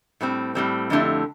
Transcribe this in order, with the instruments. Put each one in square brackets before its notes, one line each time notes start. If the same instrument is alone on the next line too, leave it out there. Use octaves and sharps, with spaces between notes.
[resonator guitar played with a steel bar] A2 G3 C4
A2 G3 C4
F2 D3 A3 E4 G4